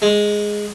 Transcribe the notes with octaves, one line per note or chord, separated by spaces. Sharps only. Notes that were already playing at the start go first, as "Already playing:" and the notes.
G#3